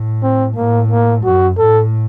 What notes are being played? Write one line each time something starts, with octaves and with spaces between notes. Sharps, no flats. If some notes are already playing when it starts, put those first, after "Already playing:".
Already playing: A2
C4
A2 A#3
A#3
F#2 F#4
A2 A4